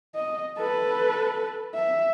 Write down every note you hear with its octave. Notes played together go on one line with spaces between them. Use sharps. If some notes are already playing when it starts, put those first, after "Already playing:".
D#5
A4 B4
E5